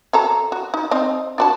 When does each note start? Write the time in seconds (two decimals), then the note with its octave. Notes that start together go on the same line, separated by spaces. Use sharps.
0.13 F#3 A4 A#5
0.52 F#4
0.74 D#4
0.91 C4 D#4 D#5
1.38 D4 F#4 A5